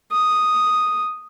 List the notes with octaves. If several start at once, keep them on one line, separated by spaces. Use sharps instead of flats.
D#6